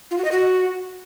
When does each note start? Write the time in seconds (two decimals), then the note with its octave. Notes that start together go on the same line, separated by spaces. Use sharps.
0.11 F4
0.18 F#4
0.25 D#5
0.32 F#4